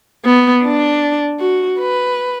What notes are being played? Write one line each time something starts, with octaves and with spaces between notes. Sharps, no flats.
B3
D4
F#4
B4